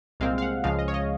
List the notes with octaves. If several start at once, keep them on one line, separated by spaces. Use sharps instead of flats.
C2 A#2 G#3 C4 F5
F5
F#5
C#2 C#3 F3 G#3 F5
D#5
C#5
D#5